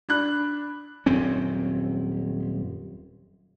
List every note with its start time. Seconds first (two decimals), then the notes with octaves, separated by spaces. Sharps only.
0.09 D4 B5 F#6
1.06 D#1 F#2 C4 C#4